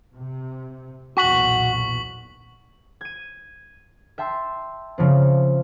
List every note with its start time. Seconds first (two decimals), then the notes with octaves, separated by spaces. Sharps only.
0.16 C3
1.17 B1 E2 A#2 F#4 C#6 B6 F#7
3.01 G#6 D#7
4.18 E5 G5 A5 C6 E6
4.98 C#3 F3 C4